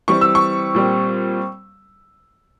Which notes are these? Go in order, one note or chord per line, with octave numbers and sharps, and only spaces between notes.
E3 G3 C4 C#6
E6
C#6
A#2 G3 C4